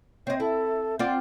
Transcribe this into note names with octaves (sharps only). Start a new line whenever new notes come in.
C4 C#5 D#5
E4 A4
C4 F4 D5 F#5